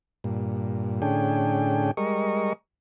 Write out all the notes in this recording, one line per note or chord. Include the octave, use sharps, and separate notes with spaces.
G2 A#2
A2 D3 C#4 D4 G#4 G5
G3 G#3 A#4 D#5 C#6